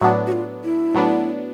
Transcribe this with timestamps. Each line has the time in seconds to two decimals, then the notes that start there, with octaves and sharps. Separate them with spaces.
0.01 A2 F#3 B3 D4 F#4
0.27 F#4
0.32 F4
0.64 E4
0.94 A2 F#3 B3 D4